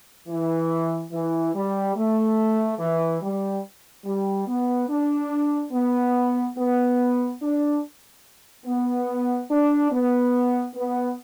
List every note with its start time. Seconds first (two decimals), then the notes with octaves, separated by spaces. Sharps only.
0.28 E3
1.12 E3
1.54 G3
1.95 A3
2.79 E3
3.21 G3
4.05 G3
4.47 B3
4.89 D4
5.71 B3
6.56 B3
7.40 D4
8.65 B3
9.49 D4
9.91 B3
10.74 B3